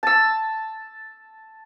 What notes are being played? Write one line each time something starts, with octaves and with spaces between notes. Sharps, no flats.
A5 E6